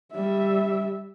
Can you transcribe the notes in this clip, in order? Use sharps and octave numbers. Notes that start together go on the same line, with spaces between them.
G3 E5